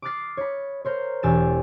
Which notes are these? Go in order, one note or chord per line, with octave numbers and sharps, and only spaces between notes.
D6 D#6 F6 F#6 A6 C7
C#5 B5
A#4 C5 C#5
E1 G4 G#5 E6 A6 E7